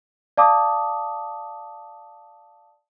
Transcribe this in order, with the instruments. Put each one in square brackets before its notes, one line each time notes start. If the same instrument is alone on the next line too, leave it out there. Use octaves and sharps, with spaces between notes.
[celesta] D5 F5 A5 D6 D#6